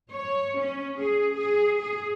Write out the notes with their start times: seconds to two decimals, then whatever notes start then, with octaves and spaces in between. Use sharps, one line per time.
0.11 C#5
0.59 C#4
0.98 G#4
1.36 G#4
1.79 G#4